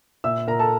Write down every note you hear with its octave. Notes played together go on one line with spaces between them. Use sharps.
A#2 E5 E6
A#2 A#4 A#5
A4 A5